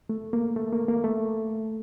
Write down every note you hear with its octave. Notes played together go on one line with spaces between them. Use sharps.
A3
A#3
A3
A#3
A#3
A3